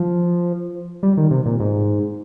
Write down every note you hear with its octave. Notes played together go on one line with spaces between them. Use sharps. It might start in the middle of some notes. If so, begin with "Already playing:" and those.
Already playing: F3
G3
D#3
C3
A#2
G#2